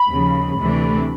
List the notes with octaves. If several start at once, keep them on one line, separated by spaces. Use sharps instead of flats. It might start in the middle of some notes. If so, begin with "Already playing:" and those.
Already playing: B5
D#2 C#3 F3
D2 C3 E3 A3 D4